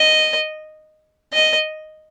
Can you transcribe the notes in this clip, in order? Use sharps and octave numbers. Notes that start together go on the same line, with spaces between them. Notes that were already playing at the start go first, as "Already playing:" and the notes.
Already playing: D#5
D#5